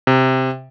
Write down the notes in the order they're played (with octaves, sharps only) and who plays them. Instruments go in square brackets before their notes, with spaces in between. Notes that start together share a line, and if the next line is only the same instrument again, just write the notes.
[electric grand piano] C3